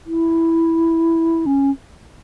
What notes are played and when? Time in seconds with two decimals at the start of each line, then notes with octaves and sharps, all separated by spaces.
0.06 E4
1.46 C#4